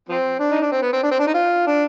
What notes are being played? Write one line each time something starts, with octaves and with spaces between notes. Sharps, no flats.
F3 C4
D4
D#4
D4
C4
B3
C4
D4
C4
D4
D#4
F4
D4